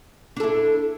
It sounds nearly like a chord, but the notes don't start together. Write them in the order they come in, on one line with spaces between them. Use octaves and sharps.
D4 A4 E4